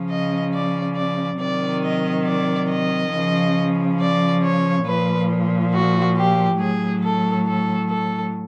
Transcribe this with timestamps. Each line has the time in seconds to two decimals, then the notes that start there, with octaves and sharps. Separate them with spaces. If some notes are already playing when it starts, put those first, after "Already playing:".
Already playing: C#3 F3
0.09 D#5
0.53 D5
0.96 D5
1.40 C3 D#3 F#3 D5
1.83 D#5
2.26 D5
2.70 D#5
3.13 C#3 F3
3.99 D5
4.43 C#5
4.86 A#2 F3 B4
5.73 F#4
6.16 G4
6.59 A2 F#3 G#4
7.03 A4
7.46 A4
7.90 A4